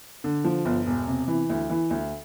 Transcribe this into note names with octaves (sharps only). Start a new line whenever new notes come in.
D3
F3
G1
E1
C3
E3
D2
E3
D2